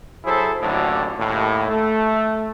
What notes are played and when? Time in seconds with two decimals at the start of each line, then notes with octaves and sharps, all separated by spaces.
0.25 F#3 E4 G#4 A4 C5
0.61 A1 D#2 A2 D3 F#3
1.18 D#2 A2
1.69 A3